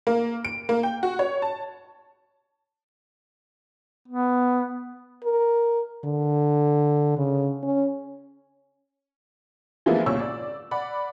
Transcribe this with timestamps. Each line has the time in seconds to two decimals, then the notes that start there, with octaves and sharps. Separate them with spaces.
0.07 A#3
0.45 D7
0.69 A#3
0.83 G5
1.03 F#4
1.19 C#5
1.42 A5
4.08 B3
5.24 A#4
6.05 D3
7.17 C#3
7.63 C#4
9.86 E3 F3 G#3 A#3 B3 E4
10.06 C2 A#2 C#3 C#4 C#6 E6
10.19 D5
10.71 D5 F#5 B5